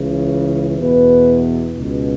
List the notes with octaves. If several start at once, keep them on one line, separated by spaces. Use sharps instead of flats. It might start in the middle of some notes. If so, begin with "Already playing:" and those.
Already playing: C#2 C#3 E3
E2 B2 B4
C#2 B2